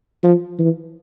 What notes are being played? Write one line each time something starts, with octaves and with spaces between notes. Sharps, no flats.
F3
E3